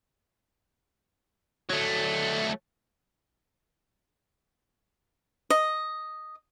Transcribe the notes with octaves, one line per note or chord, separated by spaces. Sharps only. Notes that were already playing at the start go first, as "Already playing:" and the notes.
F#3 A3
D#5